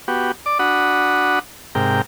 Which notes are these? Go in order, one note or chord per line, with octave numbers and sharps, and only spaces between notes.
B3 F#4 G4
D5 D6
D4 F#4 F#5 B5 D#6
G#2 C3 A#4 G5